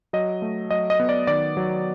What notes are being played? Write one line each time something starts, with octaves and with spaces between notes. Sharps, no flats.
F#3 D#5
A3
F#3 D#5
D#5
B3
D5
D#3 D5
F#3